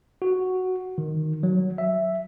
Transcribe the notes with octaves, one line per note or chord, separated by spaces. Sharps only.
F#4
D#3
F#3
E5